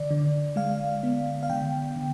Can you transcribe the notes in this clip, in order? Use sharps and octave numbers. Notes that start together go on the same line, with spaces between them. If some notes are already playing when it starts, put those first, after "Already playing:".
Already playing: D3 D5
D3
G#3 F5
B3
F5
D3 G5
D3